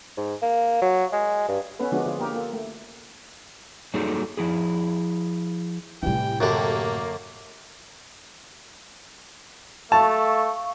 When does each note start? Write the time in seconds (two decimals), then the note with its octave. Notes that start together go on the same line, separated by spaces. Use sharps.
0.17 G#2
0.42 A#3
0.81 F#3
1.12 G#3
1.48 G2
1.79 B3 C#4 A4 B4
1.92 D3 F3 G#3 B3 D4 F#4
2.05 D3 F4 G#4
2.18 A#3 G4 A#4
2.33 A#3 F4 A4
2.53 A3
3.94 F#3 G3 A#3 D#4 G#4 A4
4.37 F3 E4 G#4
6.03 A2 C3 E3 G3 G5
6.40 F#2 D3 A#3 D4 F#4 G4 A4
9.92 A3 F5 A5 C#6